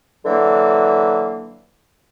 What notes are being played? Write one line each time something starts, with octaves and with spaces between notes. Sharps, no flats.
D3 E3 F#3 A#3